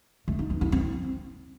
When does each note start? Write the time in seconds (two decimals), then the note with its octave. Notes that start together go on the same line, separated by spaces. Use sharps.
0.28 A3
0.39 D#4
0.50 B3
0.61 E4
0.72 C4